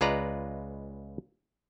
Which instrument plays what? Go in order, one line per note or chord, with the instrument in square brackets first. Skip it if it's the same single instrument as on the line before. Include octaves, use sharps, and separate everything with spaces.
[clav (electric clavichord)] C#2 G#3 F4 B4 D5 A#5